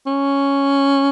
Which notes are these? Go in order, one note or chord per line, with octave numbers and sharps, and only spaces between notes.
C#4